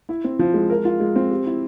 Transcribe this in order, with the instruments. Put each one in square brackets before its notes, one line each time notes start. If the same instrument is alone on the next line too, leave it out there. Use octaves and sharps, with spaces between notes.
[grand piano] E4
C4
F3
G#3
A#4
F4
G#3
C4
G4
E4